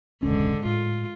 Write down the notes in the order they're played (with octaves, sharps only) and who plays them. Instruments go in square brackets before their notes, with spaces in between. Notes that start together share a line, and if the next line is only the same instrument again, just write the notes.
[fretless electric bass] E1 C#2 C#4 [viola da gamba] G#2 D3
[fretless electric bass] A2 [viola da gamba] F4